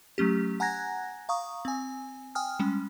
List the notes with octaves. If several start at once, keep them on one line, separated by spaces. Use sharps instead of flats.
F#3 A3 C#4 G4
F#5 G#5 A#5 F#6 G#6 A#6
F5 A#5 C#6 D#6
C4 G#5
G5 G#5 D#6 F6
G3 G#3 C#4